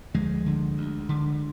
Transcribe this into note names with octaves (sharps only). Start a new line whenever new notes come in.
D2 F3 G#3
D3
D2
D3